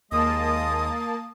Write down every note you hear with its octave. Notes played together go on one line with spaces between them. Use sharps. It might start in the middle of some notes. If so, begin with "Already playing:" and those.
D#2 G#3 A#3 D#5 A5 D#6